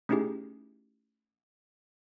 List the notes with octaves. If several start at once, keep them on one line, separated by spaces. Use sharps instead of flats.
A3 C#4 D#4 E4 G4 G#4